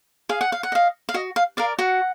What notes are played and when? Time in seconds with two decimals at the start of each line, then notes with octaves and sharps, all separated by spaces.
0.29 G#4 F5
0.41 F#5
0.52 F5
0.63 F#5
0.72 D#5 F5
1.09 F5
1.14 F#4 D#5
1.36 F5
1.57 A#4 D5 F5
1.79 F#4 F#5